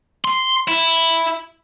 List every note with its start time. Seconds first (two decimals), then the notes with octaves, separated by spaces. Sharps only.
0.25 C6
0.68 E4